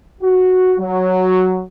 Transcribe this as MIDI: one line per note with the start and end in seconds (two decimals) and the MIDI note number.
0.22 0.73 66
0.78 1.61 54